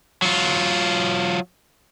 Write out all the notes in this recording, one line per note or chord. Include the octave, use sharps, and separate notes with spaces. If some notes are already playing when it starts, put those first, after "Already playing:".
F#3 F4